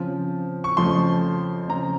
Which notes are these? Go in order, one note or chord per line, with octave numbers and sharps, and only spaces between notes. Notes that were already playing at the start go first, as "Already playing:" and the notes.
Already playing: C#3 F3 C4
C#6
F2 C#3 F3 A3 C6
C#3 F3 C4 A#5